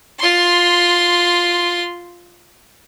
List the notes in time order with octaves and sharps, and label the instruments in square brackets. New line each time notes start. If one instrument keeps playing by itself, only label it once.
[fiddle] F4 C6